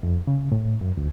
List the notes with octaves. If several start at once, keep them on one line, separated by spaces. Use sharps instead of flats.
F2
C#3
A2
F#2
D2